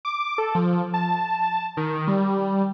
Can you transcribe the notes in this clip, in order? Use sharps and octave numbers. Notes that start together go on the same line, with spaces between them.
D6
A4
F3
A5
D#3
G3